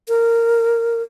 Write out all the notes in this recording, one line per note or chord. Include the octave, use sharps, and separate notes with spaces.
A#4